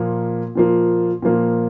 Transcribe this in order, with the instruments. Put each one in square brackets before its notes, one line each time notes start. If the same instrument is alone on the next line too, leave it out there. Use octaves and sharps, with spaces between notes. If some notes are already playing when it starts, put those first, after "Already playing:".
Already playing: [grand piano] A#2 F3 A#3
A#2 F3 A#3
A#2 F3 A#3